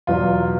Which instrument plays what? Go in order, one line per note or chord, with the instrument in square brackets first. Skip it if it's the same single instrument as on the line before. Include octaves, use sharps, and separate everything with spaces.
[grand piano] E2 B2 F#3 F4